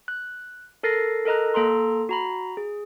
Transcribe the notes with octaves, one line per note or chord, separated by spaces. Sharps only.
F#6
A4 A#4 A6 A#6 C7
A4 A#4 D#5 A#5 F#6
A#3 A4 A#5 C6
F#4 A#5 B5
G#4